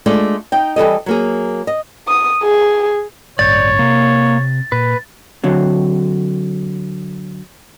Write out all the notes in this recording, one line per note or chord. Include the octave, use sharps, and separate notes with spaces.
G#3 A3 D4 F4 D5
D#4 G5
E3 G3 A4 D#5
F#3 A#3 G#4
D#5
D#6
G#4
A1 G2 C#5 D5 G6 A6
C3 A#3
A#2 B4
D3 F#3 C4